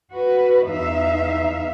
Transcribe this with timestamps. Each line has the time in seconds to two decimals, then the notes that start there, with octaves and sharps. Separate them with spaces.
0.13 F#4 B4
0.66 E2 D#4 E5 F5